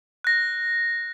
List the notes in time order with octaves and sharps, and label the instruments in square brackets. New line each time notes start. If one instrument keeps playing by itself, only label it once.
[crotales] F#6 A#6